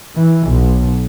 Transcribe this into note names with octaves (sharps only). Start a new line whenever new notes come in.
E3
B1